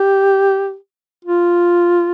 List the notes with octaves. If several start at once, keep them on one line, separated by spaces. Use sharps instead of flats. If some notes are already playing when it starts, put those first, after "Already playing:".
Already playing: G4
F4